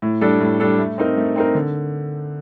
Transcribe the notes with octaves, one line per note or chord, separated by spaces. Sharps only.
A2
G3 D4 A4
A2
G3 D4 A4
A3
C4 D#4 A#4
A3
C4 D#4 A#4
D3